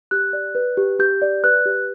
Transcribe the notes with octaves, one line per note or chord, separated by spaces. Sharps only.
G4 F#6
D5
B4
G4
G4 G6
D5
B4 F#6
G4